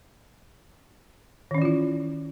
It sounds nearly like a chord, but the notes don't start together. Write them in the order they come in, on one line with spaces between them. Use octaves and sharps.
D#3 C#4 E3 F4 E4